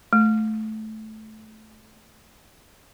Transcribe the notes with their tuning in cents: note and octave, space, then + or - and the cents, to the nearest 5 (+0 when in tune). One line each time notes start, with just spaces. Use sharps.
A3 -15